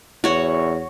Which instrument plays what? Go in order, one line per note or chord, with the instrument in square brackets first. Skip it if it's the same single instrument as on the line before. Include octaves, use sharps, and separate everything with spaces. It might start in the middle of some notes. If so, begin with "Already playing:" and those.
[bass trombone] E2 [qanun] F#4 C#5